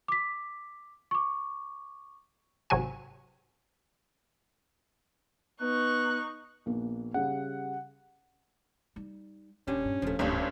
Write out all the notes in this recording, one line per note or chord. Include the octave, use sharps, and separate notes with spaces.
D6 B6
C#6 D6
G#1 C3 F#3 F#4 G#5
B3 D#4 C#6 F#6
A#1 A#3 B3
C#3 G3 F#5
G3 D#4
D#1 A#2 C#4 D4 G4
G2
D1 F3 A3 D4
D1 G#1 G2 G3 A3 C#4 E4 D#5